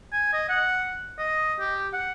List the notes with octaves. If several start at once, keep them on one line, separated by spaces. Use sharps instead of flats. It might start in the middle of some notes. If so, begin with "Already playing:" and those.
G#5
D#5
F#5
D#5
G4
F#5